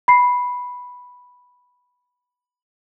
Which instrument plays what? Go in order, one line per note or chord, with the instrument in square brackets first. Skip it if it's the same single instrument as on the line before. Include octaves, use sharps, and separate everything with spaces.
[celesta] B5 C7